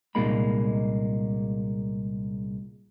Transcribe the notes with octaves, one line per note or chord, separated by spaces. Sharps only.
C2 A#2 G#3 A#3 D#4 B5